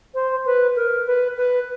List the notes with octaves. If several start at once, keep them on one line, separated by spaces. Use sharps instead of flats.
C5
B4
A#4
B4
B4